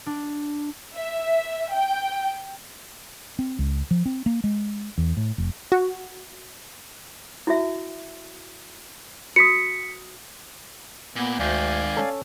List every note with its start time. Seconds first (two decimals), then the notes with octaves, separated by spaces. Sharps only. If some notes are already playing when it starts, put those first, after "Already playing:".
0.06 D4
0.97 E5
1.74 G5
3.39 C4
3.59 C#2
3.91 F3
4.06 C4
4.26 A#3
4.44 G#3
4.98 E2
5.17 A2
5.38 F1
5.72 F#4
7.47 E4 F#4 E5
9.36 F#4 D#6 B6 C#7
11.16 A#2 B3
11.40 D2 G#2 D#3 D5 F5 G#5
11.97 C#4 A4